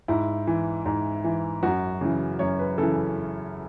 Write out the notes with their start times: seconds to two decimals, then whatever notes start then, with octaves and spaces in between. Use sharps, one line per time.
0.08 G#2 E4
0.47 E3
0.86 G#2
1.24 E3
1.63 F#2 F#4
2.01 C#3 E3
2.39 F#2 C#5
2.59 B4
2.78 C#3 E3 A4